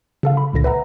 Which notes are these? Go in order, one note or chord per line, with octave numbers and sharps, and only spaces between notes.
C#3 A4 F5
B5
G#1 C#2 A#2 D3 A#6
B4 E5 F#5 A#5